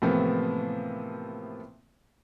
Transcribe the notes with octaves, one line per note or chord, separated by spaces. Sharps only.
A2 C3 E3 F3 A#3 B3